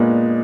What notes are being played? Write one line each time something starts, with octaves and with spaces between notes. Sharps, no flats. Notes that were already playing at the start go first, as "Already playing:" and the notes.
Already playing: A#2 G#3 B3 D4